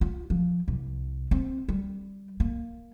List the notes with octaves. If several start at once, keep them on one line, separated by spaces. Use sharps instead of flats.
F4
F3
C2
C4
G3
A#3